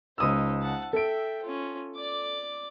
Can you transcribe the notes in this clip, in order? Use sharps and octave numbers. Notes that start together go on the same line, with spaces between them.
C#2 D#4 C5 D#6 E6
F#5 A5
A4 E5 G5 D7
C#4 F4
D5 D6